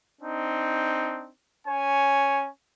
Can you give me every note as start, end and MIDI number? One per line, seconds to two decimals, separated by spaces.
0.22 1.30 60
0.22 1.30 62
0.22 1.30 63
1.67 2.48 61
1.67 2.48 73
1.67 2.48 80